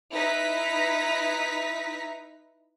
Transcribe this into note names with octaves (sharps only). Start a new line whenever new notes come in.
D#4 E4 B4 A#5 B6